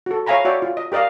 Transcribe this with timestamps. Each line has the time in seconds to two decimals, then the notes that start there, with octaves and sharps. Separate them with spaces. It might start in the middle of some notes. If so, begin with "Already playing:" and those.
0.06 F#4 A4
0.26 C#5 E5 F5 G#5 A#5 B5
0.45 F#4 C#5 D5 E5 F#5 G5
0.62 F4
0.77 D#5
0.92 G4 A#4 D5 D#5 F5